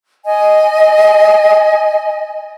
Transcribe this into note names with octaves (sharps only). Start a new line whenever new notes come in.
D#5 G#5